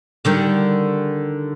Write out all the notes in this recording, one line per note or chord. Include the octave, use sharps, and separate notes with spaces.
D3 D#3 G3